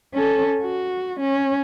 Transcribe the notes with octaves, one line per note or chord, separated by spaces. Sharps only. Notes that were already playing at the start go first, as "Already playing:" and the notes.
C#4 A4
F#4
C#4